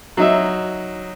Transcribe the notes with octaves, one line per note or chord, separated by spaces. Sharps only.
F#3 D#4 E5